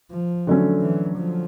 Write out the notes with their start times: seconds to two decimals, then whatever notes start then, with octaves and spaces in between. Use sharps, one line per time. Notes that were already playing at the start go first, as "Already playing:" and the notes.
0.11 F3
0.47 D3 F#3 A3 C#4
0.81 E3
1.17 F3